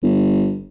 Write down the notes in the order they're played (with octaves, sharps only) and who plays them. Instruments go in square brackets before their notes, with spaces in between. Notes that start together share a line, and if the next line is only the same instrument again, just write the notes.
[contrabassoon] G1